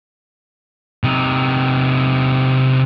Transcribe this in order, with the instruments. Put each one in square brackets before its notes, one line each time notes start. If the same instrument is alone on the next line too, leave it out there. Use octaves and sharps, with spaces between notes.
[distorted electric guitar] C3 D#4